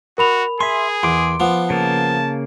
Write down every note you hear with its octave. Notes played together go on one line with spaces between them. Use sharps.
F#4 A#4 B5 F7
G#4 E5 G#5 C6
E2 C6 D6
F3 B3
C#3 A#3 A5